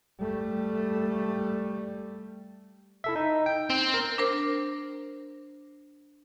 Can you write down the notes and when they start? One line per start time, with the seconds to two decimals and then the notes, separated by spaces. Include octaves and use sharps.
0.20 G3 A3
3.04 E4 A4 E5
3.16 D#4
3.46 G5
3.70 C4
3.94 A#4
4.18 D4 A#4 C5